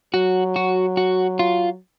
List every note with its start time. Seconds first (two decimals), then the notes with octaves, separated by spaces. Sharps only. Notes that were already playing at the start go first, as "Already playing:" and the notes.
0.14 F#3 F#4
0.56 F#4
0.97 F#4
1.39 F4